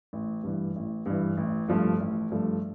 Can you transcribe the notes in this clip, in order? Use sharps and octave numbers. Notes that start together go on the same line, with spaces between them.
A1
G2 E3
A1
G2 E3
A1
G2 F3 A3
A1
G2 F3 A3